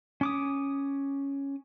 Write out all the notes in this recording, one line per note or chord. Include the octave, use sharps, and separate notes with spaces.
C#4 D6 D#6